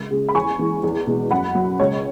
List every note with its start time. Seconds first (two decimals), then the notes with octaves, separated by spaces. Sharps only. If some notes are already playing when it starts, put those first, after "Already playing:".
Already playing: C#2
0.11 C#3 G#3
0.29 B5
0.35 E2 G#5 C#6
0.59 E3 G#3
0.83 E2
1.07 B2 G#3
1.31 F#2 F#5 B5
1.55 F#3
1.80 C#2 C#5